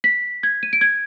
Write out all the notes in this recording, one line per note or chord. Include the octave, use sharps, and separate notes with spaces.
B6
G#6
D#7
D7
G#6